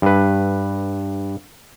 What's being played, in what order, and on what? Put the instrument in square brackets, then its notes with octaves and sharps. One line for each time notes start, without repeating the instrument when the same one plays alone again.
[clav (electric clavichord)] G2 B4